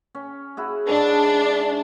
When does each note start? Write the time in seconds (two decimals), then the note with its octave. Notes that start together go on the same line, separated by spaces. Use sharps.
0.15 C#4
0.57 E4 F#4 G#4
0.89 G#2 D4